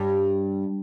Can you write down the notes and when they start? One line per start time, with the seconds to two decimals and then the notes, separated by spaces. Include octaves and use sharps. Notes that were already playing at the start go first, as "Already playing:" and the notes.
Already playing: G2